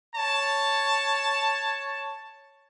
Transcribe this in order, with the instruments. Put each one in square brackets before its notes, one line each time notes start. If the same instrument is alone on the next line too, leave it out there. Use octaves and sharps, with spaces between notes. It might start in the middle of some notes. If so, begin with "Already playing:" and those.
[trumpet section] C#5 A5